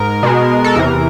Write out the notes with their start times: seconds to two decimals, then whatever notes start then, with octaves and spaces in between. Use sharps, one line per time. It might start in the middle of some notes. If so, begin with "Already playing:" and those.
Already playing: G#2 A#4
0.23 B2 G#3
0.64 A4
0.75 E2 C3 E3 A#4